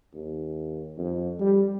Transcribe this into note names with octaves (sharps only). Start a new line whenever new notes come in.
D#2
F2
G3